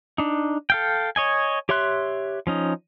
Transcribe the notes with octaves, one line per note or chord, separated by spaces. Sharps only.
D4 D#4
A4 F5 G5
C#5 D#5 G#5
G4 C#5 E5 C6 F#6
F3 C#4 D#4